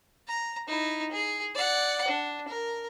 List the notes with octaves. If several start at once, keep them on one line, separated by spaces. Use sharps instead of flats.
A#5
D#4 E4
G#4
D5 F#5
D4
A#4